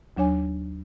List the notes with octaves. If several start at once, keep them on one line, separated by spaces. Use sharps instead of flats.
D#2 F#3 D4 C#5 G#5